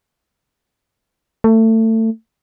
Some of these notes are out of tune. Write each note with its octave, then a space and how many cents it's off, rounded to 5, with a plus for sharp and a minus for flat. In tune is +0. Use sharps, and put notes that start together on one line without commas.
A3 +25